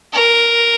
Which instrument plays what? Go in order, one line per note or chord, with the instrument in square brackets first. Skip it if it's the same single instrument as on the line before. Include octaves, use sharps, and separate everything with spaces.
[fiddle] A#4